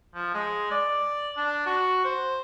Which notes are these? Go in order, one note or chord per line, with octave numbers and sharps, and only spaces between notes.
F3
G#3
D5
D4
F#4
C5